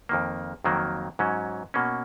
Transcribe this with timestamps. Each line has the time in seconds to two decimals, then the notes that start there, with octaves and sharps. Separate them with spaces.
0.09 F2 D#3 A#3
0.64 F2 D#3 F#3 A#3
1.19 G#2 F#3 C#4
1.74 B2 A#3 C#4